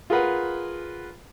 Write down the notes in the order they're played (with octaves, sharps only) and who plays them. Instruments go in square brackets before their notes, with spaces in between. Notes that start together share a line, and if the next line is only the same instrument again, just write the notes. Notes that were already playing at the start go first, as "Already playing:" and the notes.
[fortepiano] F4 G#4 A#4 B4 F#5